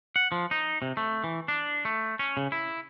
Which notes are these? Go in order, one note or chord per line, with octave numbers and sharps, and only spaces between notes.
F#5
F3
D#4
C3
A3
E3
D4
A3
C#4
C#3
E4